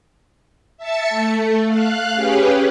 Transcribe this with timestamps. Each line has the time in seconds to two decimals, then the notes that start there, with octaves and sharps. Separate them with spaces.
0.78 E5 A5 A6 C#7
1.09 A3
1.64 F5 F#6
2.14 C#4 G4 G#4 B4